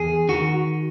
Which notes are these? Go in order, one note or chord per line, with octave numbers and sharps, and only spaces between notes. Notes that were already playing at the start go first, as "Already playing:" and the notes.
Already playing: E2 G#4
D#3 F#4